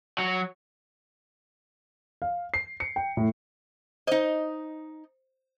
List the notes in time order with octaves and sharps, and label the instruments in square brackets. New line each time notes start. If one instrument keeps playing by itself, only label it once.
[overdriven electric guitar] F#3
[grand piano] F5
C7
C#7
G5
A2
[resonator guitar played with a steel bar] D#4 D#5 [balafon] C5